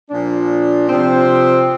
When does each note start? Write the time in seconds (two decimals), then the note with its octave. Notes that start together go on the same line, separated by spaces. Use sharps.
0.10 A#2 F3 D4
0.88 C3 F3 C4